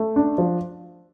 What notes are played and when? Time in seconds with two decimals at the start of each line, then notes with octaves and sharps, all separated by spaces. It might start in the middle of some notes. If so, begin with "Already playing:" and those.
Already playing: A3
0.16 D4
0.38 F3